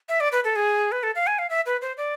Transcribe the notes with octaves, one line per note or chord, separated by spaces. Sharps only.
E5
D5
B4
A4
G#4
B4
A4
F5
G#5
F5
E5
B4
C5
D5